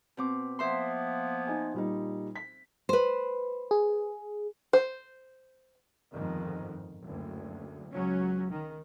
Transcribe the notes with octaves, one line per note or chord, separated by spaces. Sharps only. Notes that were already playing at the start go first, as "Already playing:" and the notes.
B2 C4 D6
F3 A#3 B3 C5 E5 C6
D#4 G#5
A#2 G3 D#4
B6
B4 C5
G#4
C5
G1 F2 G#2 D#3
F#1 D2
C#2 F#3 C#4
D#3